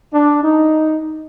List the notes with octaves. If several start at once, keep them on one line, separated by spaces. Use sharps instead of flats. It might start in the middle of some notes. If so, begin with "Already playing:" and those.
D4
D#4